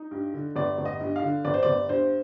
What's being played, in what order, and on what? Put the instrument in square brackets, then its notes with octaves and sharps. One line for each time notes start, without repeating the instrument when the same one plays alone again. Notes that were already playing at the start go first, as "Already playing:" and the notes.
Already playing: [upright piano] D#4
G2
D3
G1 D5
G1
D#5
G2
F5
D3
G1 D5
C5
G1 D5
G2 C5